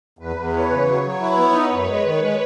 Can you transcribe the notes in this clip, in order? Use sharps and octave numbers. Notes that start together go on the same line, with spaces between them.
E2 B4
E2
E3 C#5
C#3
F#3
F#3
E4 B4
B3
D#4
F#2
G#3
D#3
G#3